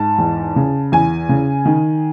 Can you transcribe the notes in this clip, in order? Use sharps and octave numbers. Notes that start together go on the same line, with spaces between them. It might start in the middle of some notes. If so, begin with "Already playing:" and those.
Already playing: G#2 A5
E2
C#3
E2 G#5
C#3
D#3